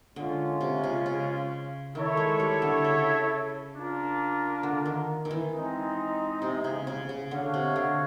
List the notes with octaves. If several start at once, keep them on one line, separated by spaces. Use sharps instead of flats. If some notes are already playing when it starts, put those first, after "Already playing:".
D3 G#3 C#4 F4
C3
C#3
C#3
D#3 E4 A4 C#5 E5
G#3
G3
D3
C#3
D4 F4 A#4
D3
D#3
D#3
E3
G#3 C4 D#4
C3
C#3
C#3
C#3
D3 F#4 A4 C#5 F5
C3
D3